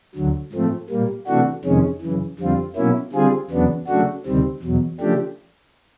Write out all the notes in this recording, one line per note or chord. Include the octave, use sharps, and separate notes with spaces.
D2 D3 F#3
G#2 F3 A3 C4
A#2 G3 A#3
C3 E3 A3 D4 F#4
F2 C3 D#3 G#3 C#4
F#2 C#3 E3
F2 D3 G3 C4 F4
B2 F#3 A#3 C#4 E4
D3 G3 C4 F4 G#4
E2 C#3 F#3 B3 D4
C#3 F#3 A3 D4 F#4
D2 C3 D#3 G3 C4
E2 B2 F#3
C#3 F3 A3 D4 G4